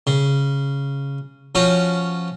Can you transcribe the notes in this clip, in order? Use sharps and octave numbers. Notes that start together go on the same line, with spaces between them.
C#3
F3 C#4 F#4